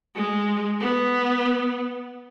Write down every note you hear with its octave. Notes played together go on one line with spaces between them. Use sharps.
G#3
B3